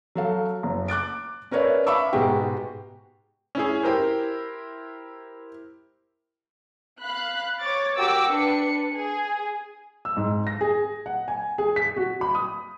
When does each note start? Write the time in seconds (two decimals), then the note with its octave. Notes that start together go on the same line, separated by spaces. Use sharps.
0.15 F#3 A4 F5
0.63 F#1
0.88 D6 F#6 A6 D7
1.51 C#4 A#4 B4 C#5 D5 E5
1.87 E5 F5 B5 C#6 D6 E6
2.13 G#2 B2 G#3 B3 F#4 G4
3.55 C#4 E4 G#4
3.83 E4 G4 A#4 C5
7.01 F5 B5 F#6
7.60 C#5 D6 A6
7.96 F#4 G4 A#4 G5 D6 E6
8.27 D4 B4 C#7
8.94 G#4 G#5
10.05 E6
10.17 G#2
10.47 A#6
10.61 G#4
11.06 F#5
11.28 G#5
11.58 G#4
11.76 B6
11.96 F#4
12.21 B5
12.35 D#6